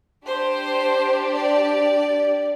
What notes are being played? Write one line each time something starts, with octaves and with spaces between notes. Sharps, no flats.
D4 G4 C5
D5